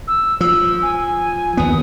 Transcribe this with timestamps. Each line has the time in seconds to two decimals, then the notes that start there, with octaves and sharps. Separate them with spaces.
0.07 E6
0.41 F3 E6
0.82 G#5
1.57 D#2 B3 D#6